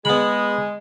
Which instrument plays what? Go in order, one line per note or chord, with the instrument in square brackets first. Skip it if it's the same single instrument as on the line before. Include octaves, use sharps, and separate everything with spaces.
[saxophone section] G#3 [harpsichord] B3 B5